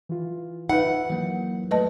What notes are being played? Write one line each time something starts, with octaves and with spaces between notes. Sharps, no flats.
E3 F4
D#4 B4 E5 F#5
E3 F#3 A#3
F#3 A3 B4 D#5 A5